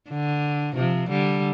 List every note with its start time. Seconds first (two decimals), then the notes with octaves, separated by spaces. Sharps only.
0.10 D3
0.76 C3 F3
1.09 D3 G3